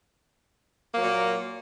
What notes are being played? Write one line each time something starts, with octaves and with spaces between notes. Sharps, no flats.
A#2 F#3 A#3